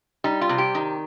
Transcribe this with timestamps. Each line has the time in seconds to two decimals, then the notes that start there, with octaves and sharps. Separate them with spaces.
0.24 G3 D#4
0.41 F4
0.49 C3
0.58 G4
0.75 D#3